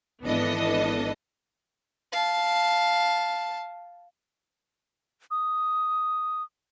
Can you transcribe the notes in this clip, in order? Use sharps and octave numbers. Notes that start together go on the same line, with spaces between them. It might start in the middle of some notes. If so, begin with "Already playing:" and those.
G#1 E3 B3 D4 A4 D#5
F5 A5
D#6